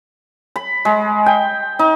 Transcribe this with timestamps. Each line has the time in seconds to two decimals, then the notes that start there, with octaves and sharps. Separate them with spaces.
0.56 B5
0.85 G#3
1.26 G5
1.79 D#4